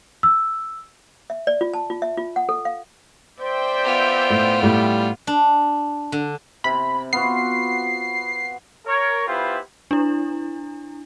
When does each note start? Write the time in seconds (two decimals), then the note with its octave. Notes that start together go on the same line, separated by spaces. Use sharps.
0.23 E6
1.30 E5
1.47 D5
1.61 F4
1.74 A5
1.90 F4
2.02 E5
2.17 F4
2.36 F#5
2.49 A4
2.65 F5
3.41 C5 D5 E5 G5
3.84 B3 F4
4.30 A2
4.63 A2 G3
5.27 D4
6.12 D3
6.64 C3 E4 B5
7.13 B3 F4 F#4 C7
8.86 A#4 C#5
9.27 B3 E4 F4 G4 B4 C5
9.91 D4 E4